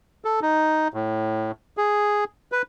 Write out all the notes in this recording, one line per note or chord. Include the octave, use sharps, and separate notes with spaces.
A4
D#4
A2
G#4
B4